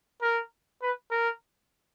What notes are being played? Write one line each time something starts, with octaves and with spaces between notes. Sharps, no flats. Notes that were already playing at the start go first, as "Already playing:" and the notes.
A#4
B4
A#4